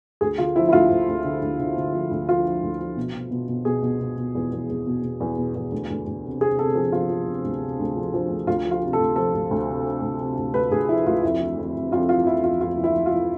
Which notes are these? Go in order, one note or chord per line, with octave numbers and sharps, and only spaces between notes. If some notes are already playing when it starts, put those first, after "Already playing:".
D2 G#4
D3 F4
F3 E4
E4
D2 F4
D2
D2
D3
D2
D3
D3
F3
D2
F3 F4
F3
D2
F3
B2
B2
B2
B2
B2 G#4
B2
B2
B2
E2
E2
E2
B2
B2
E2
B2
E2
D2
D2
D2
C3
C3 G#4
C3 A4
F3 G#4
F3 F4
F3
C3
D2
C3
D2
F3
F3
D2
D2 F4
F3
F4
C3
A4
D2
F3 A4
D2
D2
C3
C3
D2
C3
D2
D2 B4
D2 G#4
F3 E4
D2 F4
F2 E4
E3
F2
F2
F2 F4
E3 F4
F2 E4
F2 F4
F2 F4
E3
E4
E3
F4
E3